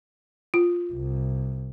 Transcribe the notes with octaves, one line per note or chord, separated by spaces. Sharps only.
F4
C2